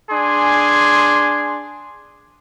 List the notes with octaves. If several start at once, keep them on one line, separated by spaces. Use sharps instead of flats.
D4 G#4 G#5 C6